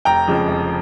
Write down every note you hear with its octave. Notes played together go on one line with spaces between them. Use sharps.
F1 G5 A#5
F2 C#3 F3 G#3
F1